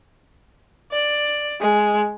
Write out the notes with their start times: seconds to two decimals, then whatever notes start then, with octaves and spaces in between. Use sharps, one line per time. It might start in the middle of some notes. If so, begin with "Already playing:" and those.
0.92 D5
1.61 G#3